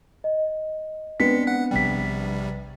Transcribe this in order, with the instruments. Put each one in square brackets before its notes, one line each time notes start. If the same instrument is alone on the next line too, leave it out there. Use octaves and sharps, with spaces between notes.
[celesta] D#5
[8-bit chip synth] G#3 C#7 [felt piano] B3 C4 D4 [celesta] B6
[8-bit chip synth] F#5 F#6
[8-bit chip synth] A#1 C3 G3 [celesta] G5 B6